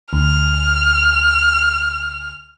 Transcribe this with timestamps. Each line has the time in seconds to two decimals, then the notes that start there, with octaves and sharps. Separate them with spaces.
0.13 D2 F6